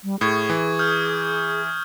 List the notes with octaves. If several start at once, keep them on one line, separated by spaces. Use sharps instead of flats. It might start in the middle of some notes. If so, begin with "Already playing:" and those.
G3
A2 G#4 C#6 G#6
E3
D#6 F6 G6